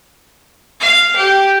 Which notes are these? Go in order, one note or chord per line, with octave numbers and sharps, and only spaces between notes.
F5
G4